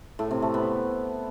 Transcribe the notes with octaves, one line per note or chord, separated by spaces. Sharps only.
A2
C3
A3
B3